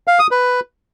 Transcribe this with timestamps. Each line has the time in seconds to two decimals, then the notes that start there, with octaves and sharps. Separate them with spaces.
0.08 F5
0.19 D#6
0.31 B4